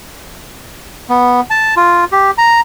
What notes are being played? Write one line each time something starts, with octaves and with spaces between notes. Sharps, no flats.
B3
A5
F4
G4
A#5